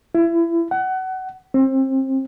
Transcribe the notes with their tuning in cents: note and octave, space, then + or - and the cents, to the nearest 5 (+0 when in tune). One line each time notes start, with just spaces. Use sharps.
E4 +30
F#5 +25
C4 +25